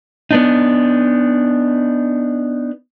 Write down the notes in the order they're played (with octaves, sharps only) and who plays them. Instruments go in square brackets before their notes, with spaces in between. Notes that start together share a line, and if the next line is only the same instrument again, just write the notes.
[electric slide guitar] B3 D4 D#4